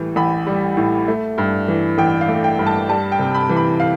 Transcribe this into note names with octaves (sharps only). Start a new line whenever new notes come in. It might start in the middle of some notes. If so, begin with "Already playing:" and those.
Already playing: A2 E3 G3
A1 B5
G3
A2
A3
G2
E3
A1 G5
F5
A3
G5
G2
A5
G3 A5
G5
C3
B5
E3
B5
F5